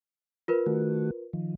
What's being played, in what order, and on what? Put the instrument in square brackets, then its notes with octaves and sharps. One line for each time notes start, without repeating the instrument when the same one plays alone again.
[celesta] F4 A#4 B4
[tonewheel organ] D#3 A3 F#4
D#3 F3